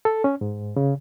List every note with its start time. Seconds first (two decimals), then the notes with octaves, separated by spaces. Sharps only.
0.05 A4
0.24 C#4
0.41 G#2
0.76 C#3